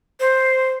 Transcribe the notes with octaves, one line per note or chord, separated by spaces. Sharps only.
C5